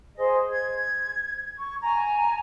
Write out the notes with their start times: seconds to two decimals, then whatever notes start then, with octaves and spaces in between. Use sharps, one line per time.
0.15 G#4 C5 D#5
0.49 G#6
1.58 C#6
1.80 G#5 A#5